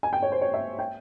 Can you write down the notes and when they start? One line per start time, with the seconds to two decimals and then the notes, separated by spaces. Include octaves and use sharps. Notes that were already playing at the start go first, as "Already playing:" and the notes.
0.03 G#5
0.13 G5
0.22 C#5
0.32 C5
0.41 C#5
0.54 E5
0.79 G5